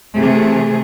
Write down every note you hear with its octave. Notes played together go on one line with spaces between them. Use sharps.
C3 E3 A3 G#4